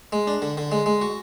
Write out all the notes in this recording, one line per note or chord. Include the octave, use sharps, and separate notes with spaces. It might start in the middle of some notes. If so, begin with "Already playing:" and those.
G#3
D4
D3
D3
G#3
G#3
F#4